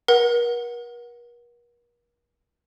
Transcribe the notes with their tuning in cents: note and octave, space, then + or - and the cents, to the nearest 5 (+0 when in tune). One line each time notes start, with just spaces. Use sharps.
A#4 +45 F#5 +0